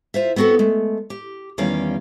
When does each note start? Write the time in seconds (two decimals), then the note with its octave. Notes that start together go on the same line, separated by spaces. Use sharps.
0.14 F4 C5 E5
0.36 B3 C4 F#4 G#4 A4
0.59 G#3 A3
1.10 G4
1.58 E2 D#3 G3 C#4 F5